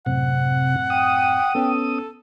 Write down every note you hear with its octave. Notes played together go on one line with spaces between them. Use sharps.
F#2 A2 C3 C4 F#5
G5 D#6
B3 C#4 A4